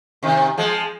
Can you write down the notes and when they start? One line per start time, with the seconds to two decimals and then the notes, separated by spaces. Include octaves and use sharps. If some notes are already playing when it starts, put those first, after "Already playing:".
0.23 C3 D#3
0.57 F3 G#3